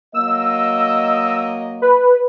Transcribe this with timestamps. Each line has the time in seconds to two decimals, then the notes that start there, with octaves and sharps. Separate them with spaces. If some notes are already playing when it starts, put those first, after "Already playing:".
0.14 F#3 A#3 D#5 E6
1.82 B4